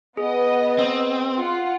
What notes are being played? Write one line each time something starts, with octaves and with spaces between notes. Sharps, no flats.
B3 G#4 D#5
C4
F4 F#5